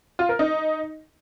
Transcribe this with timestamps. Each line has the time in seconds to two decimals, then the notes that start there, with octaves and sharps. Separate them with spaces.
0.19 F4
0.29 A#4
0.39 D#4